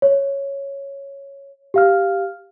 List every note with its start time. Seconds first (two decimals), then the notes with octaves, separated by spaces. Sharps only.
0.02 C#5
1.74 G4 F5 F6